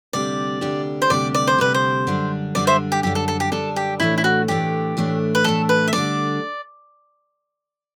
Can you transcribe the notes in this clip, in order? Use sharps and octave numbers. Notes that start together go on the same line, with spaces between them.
D2 C3 G3 D4 G4 D5
D2 C3 G3 D4 G4
C5
D2 C3 G3 D4 G4 D5
D5
C5
D2 C3 G3 D4 G4 B4
C5
F#2 D3 G3 D4
F#2 D3 G3 D4 D5
C5 E5
G4
F#2 D3 G3 D4 G4
A4
A4
G4
F#2 D3 G3 D4 A4
G4
A2 E3 A3 D4 E4
E4
F#4
A2 E3 A3 D4 G4
A2 E3 A3 D4
B4
A2 E3 A3 D4 A4
B4
E5
D3 G3 D4 D5